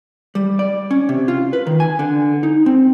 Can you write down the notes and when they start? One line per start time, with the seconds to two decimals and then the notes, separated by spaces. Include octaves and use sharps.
0.35 G3
0.59 D5
0.91 C#4
1.09 C3
1.28 F4
1.53 B4
1.67 D#3
1.80 G#5
1.99 D3
2.43 D#4
2.66 C4